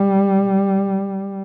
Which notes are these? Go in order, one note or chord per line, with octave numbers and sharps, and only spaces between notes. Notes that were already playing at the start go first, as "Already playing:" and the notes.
Already playing: G3